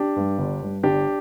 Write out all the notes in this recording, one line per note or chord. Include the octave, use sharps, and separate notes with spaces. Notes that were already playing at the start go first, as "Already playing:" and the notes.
Already playing: D4 G4
G2 G3
G1
G2 G3
G1 D4 G4